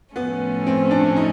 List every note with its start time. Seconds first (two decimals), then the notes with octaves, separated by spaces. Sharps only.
0.16 A2 F3 A3 B3 C#4
0.67 C4
0.91 D4
1.16 D#4